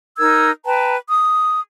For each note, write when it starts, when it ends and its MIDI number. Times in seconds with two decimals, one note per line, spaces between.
0.18 0.50 63
0.18 0.50 70
0.18 0.50 88
0.18 0.50 92
0.65 0.95 71
0.65 0.95 79
0.65 0.95 81
0.65 0.95 82
1.10 1.59 87